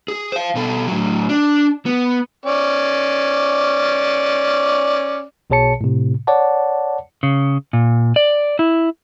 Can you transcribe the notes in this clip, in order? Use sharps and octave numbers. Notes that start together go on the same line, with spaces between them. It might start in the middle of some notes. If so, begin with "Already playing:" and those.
G#4
C5 F5
B2 A4
A2 F#3
D4
B3
C#4 D5
B1 B2 G#4 C#5 A5 C#7
A2 C3
C#5 D5 F#5 A5
C#3
A#2
D5
E4